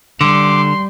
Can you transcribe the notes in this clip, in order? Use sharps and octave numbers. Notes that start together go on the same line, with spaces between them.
D3 G3 C6 D6